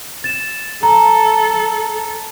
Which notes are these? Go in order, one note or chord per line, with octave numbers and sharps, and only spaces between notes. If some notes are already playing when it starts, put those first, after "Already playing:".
A6 E7
A4 A#5